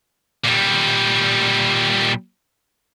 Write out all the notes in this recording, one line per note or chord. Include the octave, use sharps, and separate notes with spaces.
A#2 G3